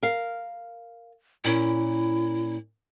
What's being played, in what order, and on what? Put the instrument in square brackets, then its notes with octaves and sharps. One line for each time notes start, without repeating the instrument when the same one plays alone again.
[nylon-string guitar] A#4 F5
[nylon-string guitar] A#2 C#4 [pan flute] E4